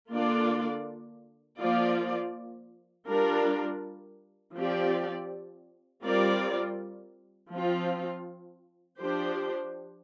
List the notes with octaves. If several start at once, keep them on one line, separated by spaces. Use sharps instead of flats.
D3 A#3 D4 F4 D5
F3 A#3 F4 D5
G3 D4 F4 A#4
F3 C4 G4 D5
G3 C4 F4 A#4 D5
F3 C4 F4
F3 D4 G4 C5